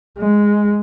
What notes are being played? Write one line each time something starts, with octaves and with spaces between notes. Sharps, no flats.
G#3